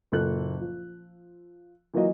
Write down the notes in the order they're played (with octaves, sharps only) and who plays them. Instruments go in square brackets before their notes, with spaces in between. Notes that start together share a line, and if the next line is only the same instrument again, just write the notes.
[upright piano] F#1 A#2 A4 F#6
F3
E3 F#3 A#3 F4 F#4 D#5